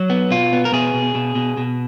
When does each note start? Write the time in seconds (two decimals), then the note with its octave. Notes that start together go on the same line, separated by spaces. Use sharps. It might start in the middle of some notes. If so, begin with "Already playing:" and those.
Already playing: F#3
0.10 B3
0.31 B2 F4
0.53 B3
0.65 A#4
0.73 B2 G#4
0.94 B2
1.15 B2
1.35 B2
1.57 B2